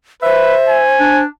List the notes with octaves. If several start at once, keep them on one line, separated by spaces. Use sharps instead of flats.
B4 C5 E5
G#5
D4